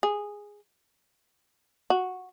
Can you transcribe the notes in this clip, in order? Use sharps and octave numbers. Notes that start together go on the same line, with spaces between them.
G#4
F#4